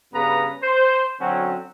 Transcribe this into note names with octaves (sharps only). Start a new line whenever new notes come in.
G2 C#3 B3 B4 A#5
C5
D3 F#3 C4 C#4 F#4